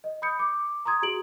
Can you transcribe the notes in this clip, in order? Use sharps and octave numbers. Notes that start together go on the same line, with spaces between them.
D#5
B5 D#6 G6 C#7
D6
A#5 C6 D#6 G#6
F#4 G#4 D7 F#7